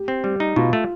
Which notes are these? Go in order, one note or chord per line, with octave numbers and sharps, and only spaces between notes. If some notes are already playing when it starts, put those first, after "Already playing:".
Already playing: G4
C4
G3 G4
D#4
B2 F4
A3